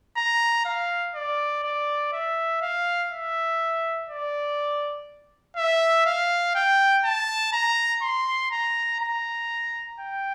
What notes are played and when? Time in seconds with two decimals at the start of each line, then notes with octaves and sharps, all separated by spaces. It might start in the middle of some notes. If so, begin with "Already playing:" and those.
0.17 A#5
0.65 F5
1.15 D5
1.64 D5
2.13 E5
2.62 F5
3.11 E5
4.10 D5
5.57 E5
6.06 F5
6.55 G5
7.04 A5
7.53 A#5
8.02 C6
8.51 A#5
9.00 A#5
9.99 G5